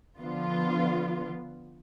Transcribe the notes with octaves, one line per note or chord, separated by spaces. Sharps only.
D3 F3 B3 F4